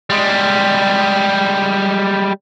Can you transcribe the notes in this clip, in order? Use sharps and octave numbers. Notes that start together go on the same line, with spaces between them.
G3 G#3